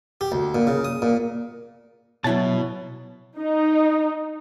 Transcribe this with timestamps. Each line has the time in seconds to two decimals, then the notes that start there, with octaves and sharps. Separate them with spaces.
0.21 G4
0.32 D2
0.55 A#2
0.67 C#3
0.85 D#6
1.02 A#2
2.24 B2 F#3 E4 C#5 A5
3.38 D#4